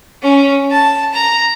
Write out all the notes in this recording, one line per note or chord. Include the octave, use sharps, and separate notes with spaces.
C#4
A5
A#5